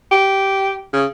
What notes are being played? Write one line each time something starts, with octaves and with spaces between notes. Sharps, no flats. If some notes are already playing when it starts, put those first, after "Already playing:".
G4
C#3